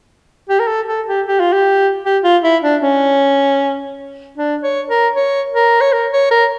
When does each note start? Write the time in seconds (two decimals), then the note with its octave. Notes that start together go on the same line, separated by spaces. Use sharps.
0.49 G4
0.59 A#4
0.67 A4
0.87 A4
1.07 G4
1.26 G4
1.40 F4
1.53 G4
2.04 G4
2.23 F4
2.43 E4
2.63 D4
2.82 C#4
4.37 D4
4.63 C#5
4.89 A#4
5.15 C#5
5.54 A#4
5.81 C#5
5.92 A#4
6.13 C#5
6.31 A#4